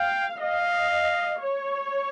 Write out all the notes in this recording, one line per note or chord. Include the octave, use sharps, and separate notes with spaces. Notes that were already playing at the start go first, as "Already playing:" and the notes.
Already playing: F5 G5
D#5 F5
C#5